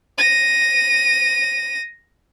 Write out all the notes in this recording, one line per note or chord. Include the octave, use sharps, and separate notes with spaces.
A#6 D#7